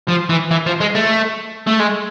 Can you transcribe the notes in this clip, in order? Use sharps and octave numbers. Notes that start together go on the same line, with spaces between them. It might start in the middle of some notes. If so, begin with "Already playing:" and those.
F3
E3
E3
F3
G#3
A3
A3
G#3